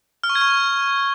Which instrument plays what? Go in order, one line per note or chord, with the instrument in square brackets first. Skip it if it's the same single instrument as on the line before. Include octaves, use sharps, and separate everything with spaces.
[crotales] F6
C#6
G#6
C#6